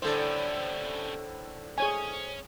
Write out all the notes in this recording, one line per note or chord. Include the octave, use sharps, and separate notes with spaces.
A2 D3 G3 C#4 A4 C5 D5
C#4 G#4 C#5 G#5